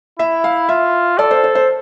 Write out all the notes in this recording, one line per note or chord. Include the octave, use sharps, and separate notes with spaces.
E4 E5
F5
F4 E5
A4 D5
C5
C5
C5